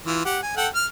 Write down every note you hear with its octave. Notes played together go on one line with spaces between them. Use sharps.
E3 F4
G4 F#5
G#5
A4 F#5 G5
F6